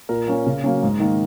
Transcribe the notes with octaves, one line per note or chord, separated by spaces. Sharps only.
A#2 A#4
A#3 C#4
C#3
F#3 A#3 C#4
G#2
D#3 A#3